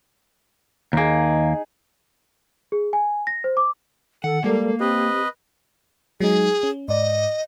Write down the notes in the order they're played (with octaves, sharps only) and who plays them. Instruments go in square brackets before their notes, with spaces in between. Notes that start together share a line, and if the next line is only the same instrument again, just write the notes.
[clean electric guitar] D#2 A#3 [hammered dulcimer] D#4 G#4
[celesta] G#4
G#5
A#6
C5
D6
[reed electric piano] D#3 [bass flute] A4 [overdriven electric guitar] F#5
[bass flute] G3 [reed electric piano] G#3 A4 A#4 [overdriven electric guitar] A#3
[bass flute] C4 [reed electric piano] G4 [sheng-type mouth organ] B4 D#5
[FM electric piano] F#3 G#3 D#4 [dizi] G#4
[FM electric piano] C#4
[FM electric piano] G#2 D5 [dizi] D#5